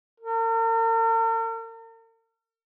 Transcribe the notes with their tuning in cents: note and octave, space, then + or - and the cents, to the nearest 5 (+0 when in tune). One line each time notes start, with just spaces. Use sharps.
A#4 -45